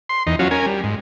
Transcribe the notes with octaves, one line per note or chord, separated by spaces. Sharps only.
C6
E2 D#4
F#3 C#4 F4 F#4
C#4 A#4 G#5
G3
G#2